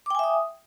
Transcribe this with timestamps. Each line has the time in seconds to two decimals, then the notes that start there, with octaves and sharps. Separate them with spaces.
0.06 D6
0.10 G5
0.15 G#5
0.19 E5
0.24 D#6